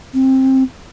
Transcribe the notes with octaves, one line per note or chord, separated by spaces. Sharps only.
C4